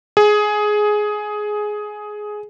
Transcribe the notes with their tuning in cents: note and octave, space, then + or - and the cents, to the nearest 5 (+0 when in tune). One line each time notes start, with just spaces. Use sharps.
G#4 +10